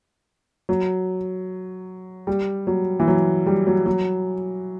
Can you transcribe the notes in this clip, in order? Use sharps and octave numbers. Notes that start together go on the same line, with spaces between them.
F#3
G3
F#3
E3
F#3
G3
F#3
F#3